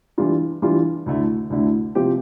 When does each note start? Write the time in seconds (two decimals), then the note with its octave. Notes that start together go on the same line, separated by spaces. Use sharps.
0.18 E3 G3 D4 F4
0.62 E3 G3 D4 F4
1.06 D2 D3 A3 E4
1.50 D2 D3 A3 E4
1.95 C3 F3 C4 G4